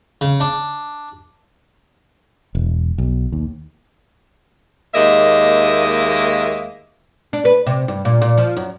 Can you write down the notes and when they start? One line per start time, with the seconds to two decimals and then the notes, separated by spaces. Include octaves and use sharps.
0.21 C#3
0.40 D4
2.55 E1
2.98 B1
3.32 D#2
4.94 D#2 G#3 A#3 D#5 E5
7.33 D4
7.45 B4
7.66 C3
7.88 G2
8.05 A#2
8.22 A#2
8.37 F3
8.57 F#2